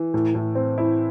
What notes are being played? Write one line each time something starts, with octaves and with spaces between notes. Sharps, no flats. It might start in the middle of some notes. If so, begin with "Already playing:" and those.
Already playing: E3
A2
A2
C4
E4